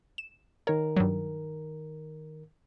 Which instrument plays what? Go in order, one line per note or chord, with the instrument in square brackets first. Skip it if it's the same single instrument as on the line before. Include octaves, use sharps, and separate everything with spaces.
[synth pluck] E7
[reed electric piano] D#3 A#4 [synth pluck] C#5
[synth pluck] G2 F#3